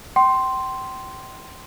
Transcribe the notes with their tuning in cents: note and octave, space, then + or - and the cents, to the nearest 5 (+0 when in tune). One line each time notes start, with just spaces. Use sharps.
G5 -30 C6 +0